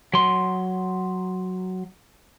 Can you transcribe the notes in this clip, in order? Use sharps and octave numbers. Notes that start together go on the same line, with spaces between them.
F#3 C6